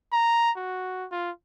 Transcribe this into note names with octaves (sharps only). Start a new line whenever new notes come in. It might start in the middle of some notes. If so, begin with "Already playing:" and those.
A#5
F#4
F4